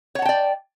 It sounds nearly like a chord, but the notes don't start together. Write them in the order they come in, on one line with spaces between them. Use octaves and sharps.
C#5 F#5 A5 G5 D5